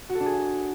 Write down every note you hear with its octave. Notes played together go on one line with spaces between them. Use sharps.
F#4
A4
D4
G#4